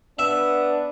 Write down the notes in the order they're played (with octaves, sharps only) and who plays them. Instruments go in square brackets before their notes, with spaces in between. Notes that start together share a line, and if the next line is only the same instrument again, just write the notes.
[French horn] B3 [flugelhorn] D4 [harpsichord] E5